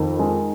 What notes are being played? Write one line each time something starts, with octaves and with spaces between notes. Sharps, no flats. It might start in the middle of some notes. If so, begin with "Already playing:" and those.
Already playing: F2 D#3 A#4
G#3